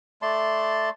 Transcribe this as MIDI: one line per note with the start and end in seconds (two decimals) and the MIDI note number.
0.22 0.89 57
0.22 0.89 74
0.22 0.89 81
0.22 0.89 84